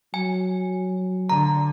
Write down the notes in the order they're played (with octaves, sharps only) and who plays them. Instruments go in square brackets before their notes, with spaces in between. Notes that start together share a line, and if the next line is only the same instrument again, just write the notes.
[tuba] F#3 [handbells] G#5
[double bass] D3 [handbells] A#5